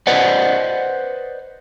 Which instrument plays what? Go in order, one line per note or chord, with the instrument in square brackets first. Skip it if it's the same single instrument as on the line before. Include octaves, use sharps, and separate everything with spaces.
[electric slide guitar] B4 C5 D5 D#5 F#5